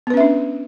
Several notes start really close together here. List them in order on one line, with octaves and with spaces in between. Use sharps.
B3 B4 C#4 E5 D4